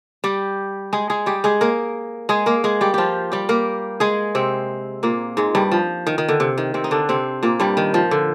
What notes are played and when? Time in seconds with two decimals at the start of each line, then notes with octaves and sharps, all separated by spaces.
0.24 G3 G4
0.93 G#3 G#4
1.10 G#3 G#4
1.26 G3 G4
1.44 G#3 G#4
1.61 A#3 A#4
2.29 G#3 G#4
2.46 A#3 A#4
2.64 G#3 G#4
2.81 G3 G4
2.94 F3 F4 G4
3.32 G3 G4
3.49 A#3 A#4
4.00 G#3 G#4
4.35 C3 C4
5.03 A#2 A#3
5.37 G#2 G#3
5.55 G2 G3
5.72 F3
6.06 D#3
6.18 D#3
6.28 D3
6.40 C3
6.58 D#3
6.74 C3 C4
6.84 D#4
6.91 D3 D4
7.09 C3 C4
7.43 A#2 A#3
7.60 G2 G3
7.77 D#3
7.94 F3
8.11 D3